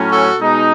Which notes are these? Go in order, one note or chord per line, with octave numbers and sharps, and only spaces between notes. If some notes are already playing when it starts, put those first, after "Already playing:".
Already playing: A2 F#3 C#4
F#4 A4
B2 G#3 D#4